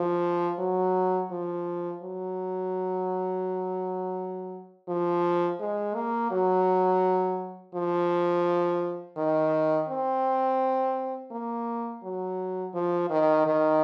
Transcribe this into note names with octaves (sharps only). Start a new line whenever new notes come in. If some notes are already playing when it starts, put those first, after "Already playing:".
Already playing: F3
F#3
F3
F#3
F3
G#3
A#3
F#3
F3
D#3
C4
A#3
F#3
F3
D#3
D#3